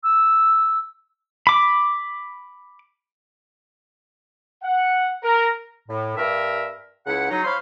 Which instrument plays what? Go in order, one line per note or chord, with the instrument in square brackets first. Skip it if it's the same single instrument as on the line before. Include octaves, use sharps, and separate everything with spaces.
[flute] E6
[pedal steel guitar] B5 D6
[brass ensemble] F#5
A#4
[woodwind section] A2
G2 A#4 E5
C#2 C#3 E4 F#5
F#3 D#4
C5 C#5 F5 B5 C6